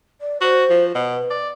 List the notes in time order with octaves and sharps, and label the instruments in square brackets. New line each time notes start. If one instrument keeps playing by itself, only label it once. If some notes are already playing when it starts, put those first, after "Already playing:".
[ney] D5
[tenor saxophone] F#4 [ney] C5
[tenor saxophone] F3
[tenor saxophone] B2 [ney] B4
[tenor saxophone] D5